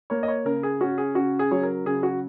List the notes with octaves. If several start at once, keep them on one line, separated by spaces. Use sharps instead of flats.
A#3 C#5
D#5
C#5
C#3 A#4
G#4
C#4 F#4
G#4
C#3 F#4
G#4
F#3 C#5
A#4
C#3 G#4
F#4